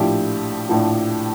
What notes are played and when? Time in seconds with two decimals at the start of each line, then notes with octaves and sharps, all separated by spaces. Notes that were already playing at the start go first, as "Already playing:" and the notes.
Already playing: A#1 A2 F3 E4 G4
0.69 A#1 A2 F3